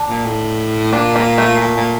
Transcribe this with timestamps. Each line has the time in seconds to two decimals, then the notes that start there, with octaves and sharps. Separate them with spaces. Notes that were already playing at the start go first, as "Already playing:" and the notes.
Already playing: D4
0.09 A#2
0.26 A2
0.92 A#2 D4
1.16 A#3
1.38 A3
1.61 A#2
1.77 A#2